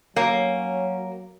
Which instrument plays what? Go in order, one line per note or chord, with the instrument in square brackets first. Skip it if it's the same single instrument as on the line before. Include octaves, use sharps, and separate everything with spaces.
[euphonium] F#3 [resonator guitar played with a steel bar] A#3 [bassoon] C#4